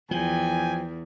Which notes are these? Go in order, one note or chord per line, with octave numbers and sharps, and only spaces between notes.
E2 F3 G5 G#5